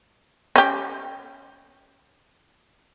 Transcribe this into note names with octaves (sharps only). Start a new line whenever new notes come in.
C#4 G4